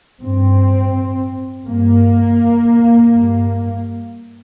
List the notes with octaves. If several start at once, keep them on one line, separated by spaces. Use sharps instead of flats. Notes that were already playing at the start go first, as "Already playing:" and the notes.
G2 C4
G2 A#3
G2